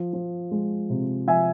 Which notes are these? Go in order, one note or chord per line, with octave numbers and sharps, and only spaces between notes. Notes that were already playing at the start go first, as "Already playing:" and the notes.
Already playing: F3
F3
G#3
C3
F3 E5 G#5